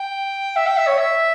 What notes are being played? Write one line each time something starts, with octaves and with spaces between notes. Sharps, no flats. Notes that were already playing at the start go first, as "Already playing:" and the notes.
Already playing: G5
E5
G5
E5
C#5
E5